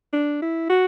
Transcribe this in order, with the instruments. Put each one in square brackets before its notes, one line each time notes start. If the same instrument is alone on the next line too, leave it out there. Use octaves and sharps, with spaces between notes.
[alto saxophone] D4
E4
F#4